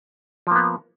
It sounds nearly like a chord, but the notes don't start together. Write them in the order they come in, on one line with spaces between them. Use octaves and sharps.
F3 A#3 B3